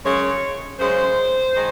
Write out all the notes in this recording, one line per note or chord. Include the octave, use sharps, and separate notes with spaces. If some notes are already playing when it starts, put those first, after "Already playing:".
F#2 C#3 G#3 C#5
F#2 C#3 G#3 C5
D#3 G#3